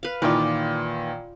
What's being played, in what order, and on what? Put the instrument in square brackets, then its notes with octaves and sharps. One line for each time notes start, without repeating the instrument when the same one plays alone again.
[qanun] B4 F5
[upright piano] A#2 D#3 E3 [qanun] F4 D5